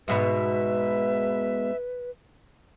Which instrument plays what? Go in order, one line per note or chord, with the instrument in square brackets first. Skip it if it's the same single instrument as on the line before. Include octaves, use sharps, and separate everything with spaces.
[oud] G#2 B2 B3 [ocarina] B4 [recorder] E5